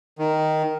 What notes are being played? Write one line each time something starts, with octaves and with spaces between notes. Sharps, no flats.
D#3